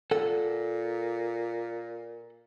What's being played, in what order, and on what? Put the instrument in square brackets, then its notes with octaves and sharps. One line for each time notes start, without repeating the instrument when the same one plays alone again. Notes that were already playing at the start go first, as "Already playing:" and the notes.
[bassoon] A#2 [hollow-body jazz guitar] A4 F#5